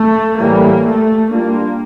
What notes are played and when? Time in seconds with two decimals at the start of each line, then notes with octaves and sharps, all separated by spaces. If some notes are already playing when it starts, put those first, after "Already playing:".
Already playing: A3
0.38 A2 E3 G3 A#3
0.84 A3
1.31 G3 A#3 D4 F4